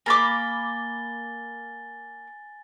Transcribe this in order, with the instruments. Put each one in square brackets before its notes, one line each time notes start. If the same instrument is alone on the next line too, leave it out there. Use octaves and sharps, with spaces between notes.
[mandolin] A#3 B5 D6 [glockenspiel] G#5 A6 G7